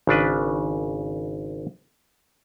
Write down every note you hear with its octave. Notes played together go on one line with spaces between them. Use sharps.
G#1 C#3 D4 B4